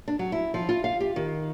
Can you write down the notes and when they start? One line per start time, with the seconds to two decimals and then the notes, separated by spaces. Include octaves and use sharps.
0.08 D4
0.19 F#3
0.32 E4
0.54 F3
0.69 F4
0.84 F5
1.00 G4
1.16 D#3